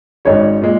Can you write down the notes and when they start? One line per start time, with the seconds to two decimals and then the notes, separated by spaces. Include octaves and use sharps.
0.25 G#1 G#2 G#3 C#4 C#5
0.62 A#2 G#3